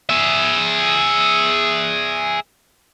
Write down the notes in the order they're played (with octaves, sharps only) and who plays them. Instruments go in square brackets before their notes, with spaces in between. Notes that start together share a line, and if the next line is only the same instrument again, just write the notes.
[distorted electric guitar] G#4 E5